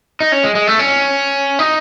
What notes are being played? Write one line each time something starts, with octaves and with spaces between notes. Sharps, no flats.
D#4
C#4
G#3
G#3
A3
C#4
D#4